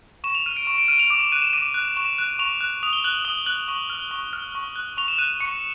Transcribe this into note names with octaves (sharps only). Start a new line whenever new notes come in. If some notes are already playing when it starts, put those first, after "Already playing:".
C#6 E7
F7
F6 D#7
D7
C#6
D7
F6 D#7
F7
D6 F7
E7
F#6 D#7
E7
D6 D#7
F#6
C#6 E7
F#6
C#6 F7
F#6
D#6 F7
G7
F#6 F#7
F#7
D#6 G7
F#6 F#7
C#6 F#7
F6
C#6
F6
C#6
F#6
C#6 F7
E7
F#6 D#7
C#6 C#7